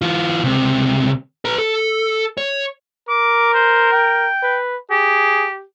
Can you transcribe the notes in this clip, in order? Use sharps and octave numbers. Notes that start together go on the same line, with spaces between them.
E3 F4
C#2 C3
B4 A#5
A4
C#5
A#4 D6
C5
G5
B4
G4 G#4